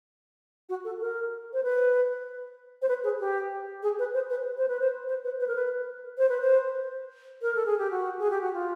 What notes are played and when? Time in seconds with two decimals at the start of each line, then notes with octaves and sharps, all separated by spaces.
0.69 F#4
0.84 A4
1.01 A#4
1.53 C5
1.63 B4
2.82 C5
2.88 B4
3.04 G#4
3.20 G4
3.83 G#4
3.99 B4
4.14 C5
4.30 B4
4.58 C5
4.68 B4
4.80 C5
5.08 C5
5.24 B4
5.40 B4
5.48 A#4
5.55 B4
6.18 C5
6.29 B4
6.41 C5
7.42 A#4
7.55 A4
7.66 G#4
7.78 G4
7.91 F#4
8.19 G#4
8.30 G4
8.41 F#4
8.54 F4